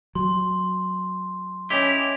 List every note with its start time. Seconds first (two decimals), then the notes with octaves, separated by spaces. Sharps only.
0.15 F#3 C6
1.70 C#4 E4 G4 D#5 E5 G#6 F7 G7